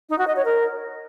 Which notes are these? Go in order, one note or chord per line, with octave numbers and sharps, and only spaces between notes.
D#4
F#4
D#5
C#5
A#4